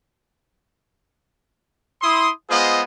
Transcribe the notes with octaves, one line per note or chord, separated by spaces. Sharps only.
E4 C6 D#6
G#3 B3 F4 G#4 C5 D#5